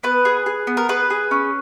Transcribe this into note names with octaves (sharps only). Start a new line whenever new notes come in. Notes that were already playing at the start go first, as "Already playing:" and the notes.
B3 B4
G#4
G#4
B3
A#4
G#4 B4
G#4
C#4